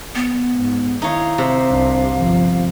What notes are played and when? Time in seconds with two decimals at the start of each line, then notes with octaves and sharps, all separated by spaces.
0.15 B3
0.56 G#2
1.02 D#3 D#4 E4 C#5 F5
1.38 C3
1.69 C2 D4
2.18 G1 F3